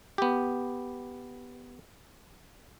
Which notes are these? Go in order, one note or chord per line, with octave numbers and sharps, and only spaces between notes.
B3 G4